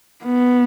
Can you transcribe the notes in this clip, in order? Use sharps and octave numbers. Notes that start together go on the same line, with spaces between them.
B3